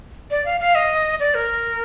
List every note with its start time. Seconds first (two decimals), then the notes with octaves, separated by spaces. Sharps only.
0.31 D5
0.45 F5
0.60 F5
0.75 D#5
1.20 D5
1.35 A#4